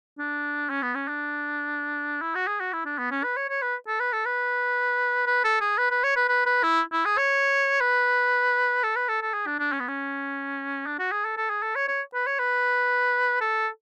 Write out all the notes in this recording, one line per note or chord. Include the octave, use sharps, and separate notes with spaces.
D4
C#4
B3
C#4
D4
E4
F#4
G#4
F#4
E4
D4
B3
C#4
B4
C#5
C#5
B4
A4
B4
A4
B4
B4
A4
G#4
B4
B4
C#5
B4
B4
B4
E4
E4
G#4
C#5
B4
A4
B4
A4
A4
G#4
D4
D4
C#4
B3
C#4
D4
F#4
G#4
A4
A4
G#4
A4
C#5
C#5
B4
C#5
B4
A4